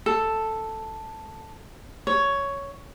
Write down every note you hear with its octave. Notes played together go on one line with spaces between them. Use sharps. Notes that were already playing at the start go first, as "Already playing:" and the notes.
A4
C#5